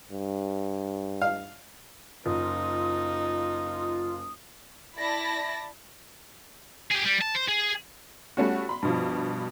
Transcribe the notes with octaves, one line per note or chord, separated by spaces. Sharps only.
G2
F5
F#1 D#4 F4 D#6
E4 D5 A5 B5 A#6
G4 G#4
G3
A5
C5
G#4
G3 A3 C#4 F#4
B5 C6
G2 B2 F3